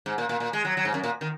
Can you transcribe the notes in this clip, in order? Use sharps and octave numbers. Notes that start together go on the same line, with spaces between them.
G#2
A#2
A#2
A#2
G#3
F#3
F#3
G#2
F#2
A#2
D#3